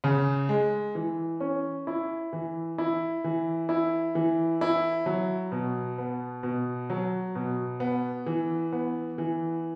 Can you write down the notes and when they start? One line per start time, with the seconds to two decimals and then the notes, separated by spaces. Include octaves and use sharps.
0.04 C#3
0.49 G#3
0.95 E3
1.40 C#4
1.87 E4
2.33 E3
2.78 E4
3.24 E3
3.69 E4
4.15 E3
4.61 E4
5.06 F#3
5.52 B2
5.98 B3
6.43 B2
6.90 F#3
7.35 B2
7.80 B3
8.26 E3
8.72 B3
9.18 E3